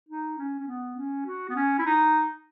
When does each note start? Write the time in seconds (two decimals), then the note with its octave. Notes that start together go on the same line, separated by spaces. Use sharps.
0.09 D#4
0.38 C#4
0.59 C#4
0.68 B3
0.97 C#4
1.26 F#4
1.49 B3
1.56 C#4
1.79 E4
1.86 D#4